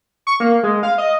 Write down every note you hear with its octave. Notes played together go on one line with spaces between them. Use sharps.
C#6
A#3
G#3
F5
D#5